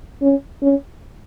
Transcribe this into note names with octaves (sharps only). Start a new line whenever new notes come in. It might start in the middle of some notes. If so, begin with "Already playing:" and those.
C#4
C#4